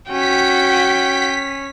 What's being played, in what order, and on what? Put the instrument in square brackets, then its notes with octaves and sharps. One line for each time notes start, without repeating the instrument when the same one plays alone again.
[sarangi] C#4 [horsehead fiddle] F#4 [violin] G5 [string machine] B6